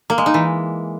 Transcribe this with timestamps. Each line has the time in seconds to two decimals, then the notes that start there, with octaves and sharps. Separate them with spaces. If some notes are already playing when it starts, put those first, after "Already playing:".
0.10 A#3
0.18 G#3
0.26 D#4
0.34 E3